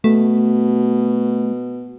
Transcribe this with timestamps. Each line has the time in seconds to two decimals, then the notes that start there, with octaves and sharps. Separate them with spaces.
0.04 B2 A3